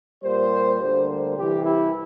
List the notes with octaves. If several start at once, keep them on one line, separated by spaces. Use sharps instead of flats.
A#2 G3 A#3 C5
D2 D3 G3 A#3 C5
C2 C3 E3 G4
E4